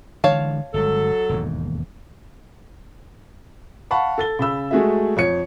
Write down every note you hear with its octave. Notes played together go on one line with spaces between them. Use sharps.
D3 E3 G#3 C#5 F5 A5
G1 F#3 G#3 A4
E1 D#2 G#2
F5 F#5 A5 B5 C#6
A4 A6 G7
C#3 B5 E6
G#3 A3 F#4 G#4 E5
F2 C#5 C#7